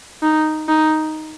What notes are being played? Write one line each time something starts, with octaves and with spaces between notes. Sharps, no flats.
D#4
D#4